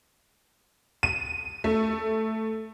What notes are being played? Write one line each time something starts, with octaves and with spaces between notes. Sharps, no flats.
D#7
A3